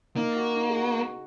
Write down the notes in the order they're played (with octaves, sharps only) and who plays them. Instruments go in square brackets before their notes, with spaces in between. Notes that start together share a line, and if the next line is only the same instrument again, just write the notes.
[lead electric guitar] A#3 [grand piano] D#4
[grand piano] F#4
D#4
G#4
F#4